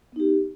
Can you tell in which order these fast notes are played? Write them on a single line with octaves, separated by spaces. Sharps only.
B3 D#4 G4